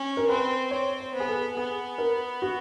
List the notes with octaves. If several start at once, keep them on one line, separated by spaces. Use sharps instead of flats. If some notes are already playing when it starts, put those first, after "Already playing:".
Already playing: C#4
A#4
C4 B4
C4 C#5
C5
B3
G#4
A4
B3 G#4
A#4
F#4